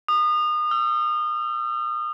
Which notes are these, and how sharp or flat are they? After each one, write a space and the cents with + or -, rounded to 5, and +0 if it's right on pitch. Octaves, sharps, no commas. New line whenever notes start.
D#6 -30
E6 +30